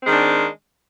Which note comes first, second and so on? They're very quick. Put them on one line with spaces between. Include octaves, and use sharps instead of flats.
C4 G#3 D#3 D4